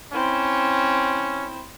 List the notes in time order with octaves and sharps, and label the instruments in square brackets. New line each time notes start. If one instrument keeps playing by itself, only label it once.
[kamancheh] C4 E4 [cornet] C#4